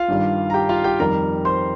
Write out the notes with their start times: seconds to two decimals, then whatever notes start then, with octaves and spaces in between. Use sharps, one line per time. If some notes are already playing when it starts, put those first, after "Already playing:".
Already playing: F4 F5
0.08 G2 D#3 G3
0.50 A#5
0.54 G4 G5
0.69 F4 F5
0.84 G4 G5
0.99 F2 D#3 G3 A#4 A#5
1.45 C5 C6